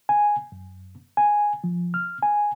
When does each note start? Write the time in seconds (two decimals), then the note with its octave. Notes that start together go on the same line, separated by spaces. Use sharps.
0.09 G#5
0.52 F#2
1.17 G#5
1.64 F3
1.94 F6
2.22 G#5